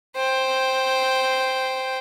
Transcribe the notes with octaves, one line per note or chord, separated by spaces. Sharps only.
C5 G5